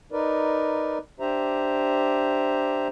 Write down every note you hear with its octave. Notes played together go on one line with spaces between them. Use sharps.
D#4 A#4 B4 D5
D4 G4 C5 E5 A#5